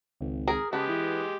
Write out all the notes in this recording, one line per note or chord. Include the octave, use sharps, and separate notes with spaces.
G#1 C#2
G#4 A#4
C#3 G#3 B3 G4 A5
E3 E4